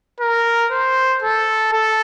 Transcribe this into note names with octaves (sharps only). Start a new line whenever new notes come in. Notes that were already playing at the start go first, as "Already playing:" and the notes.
A#4
C5
A4
A4